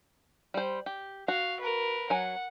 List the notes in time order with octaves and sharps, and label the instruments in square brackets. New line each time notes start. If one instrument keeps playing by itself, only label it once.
[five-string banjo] G3 C5
G4
[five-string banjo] F#4 [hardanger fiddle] F5
[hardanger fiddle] A#4 B4
[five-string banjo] F#3 G#5 [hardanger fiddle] F#5